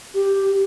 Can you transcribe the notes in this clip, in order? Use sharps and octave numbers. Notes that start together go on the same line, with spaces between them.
G4